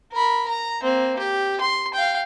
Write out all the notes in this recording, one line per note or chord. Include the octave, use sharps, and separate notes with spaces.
A#4 B5
A#5
A#3 C4
G4
C6
F5 G5